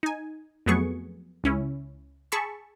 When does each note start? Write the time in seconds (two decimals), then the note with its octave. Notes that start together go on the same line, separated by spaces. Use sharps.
0.03 D#4 G#5
0.66 F2 F#3 A3 B3 G#4 C#6
1.44 C#2 C#4 E4
2.32 G#4 A5 B5 C#6 E6